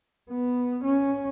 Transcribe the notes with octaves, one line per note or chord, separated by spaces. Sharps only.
B3
C#4